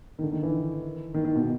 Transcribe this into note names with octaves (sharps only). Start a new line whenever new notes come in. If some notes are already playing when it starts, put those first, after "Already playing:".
D#3
D3
D#3
E3
D#3
D#3
B2